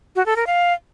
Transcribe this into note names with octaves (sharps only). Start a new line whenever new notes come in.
F#4
A4
A#4
F5